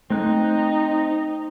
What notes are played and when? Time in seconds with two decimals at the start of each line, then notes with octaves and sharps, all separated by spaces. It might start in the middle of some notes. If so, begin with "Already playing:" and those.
0.10 A3 C4 D#4 F#6